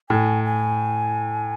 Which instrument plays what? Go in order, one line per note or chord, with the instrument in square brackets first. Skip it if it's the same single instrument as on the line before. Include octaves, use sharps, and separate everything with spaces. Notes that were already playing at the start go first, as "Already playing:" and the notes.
[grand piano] A2 [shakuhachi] G#5
[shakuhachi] G#5